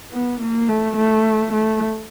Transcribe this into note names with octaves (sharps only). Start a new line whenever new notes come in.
B3
A#3
A3
A3
A3